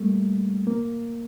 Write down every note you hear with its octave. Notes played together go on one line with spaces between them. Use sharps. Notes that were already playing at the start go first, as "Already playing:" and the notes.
Already playing: G3 A3 A#3
A#3